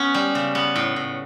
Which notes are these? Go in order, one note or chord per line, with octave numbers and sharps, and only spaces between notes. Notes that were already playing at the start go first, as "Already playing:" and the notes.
Already playing: B3 C#4
G3
C#3
B3
A2
A2